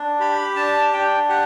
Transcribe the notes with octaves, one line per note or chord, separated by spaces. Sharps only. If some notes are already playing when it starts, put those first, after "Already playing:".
Already playing: D4
G4 B5
D4 A5
D4 G5
G4 F#5